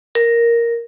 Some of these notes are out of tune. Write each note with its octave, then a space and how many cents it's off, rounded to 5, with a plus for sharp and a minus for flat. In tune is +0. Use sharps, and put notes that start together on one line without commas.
A#4 +0